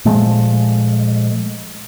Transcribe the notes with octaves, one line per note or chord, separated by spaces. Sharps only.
A#2 F3 G#3 A3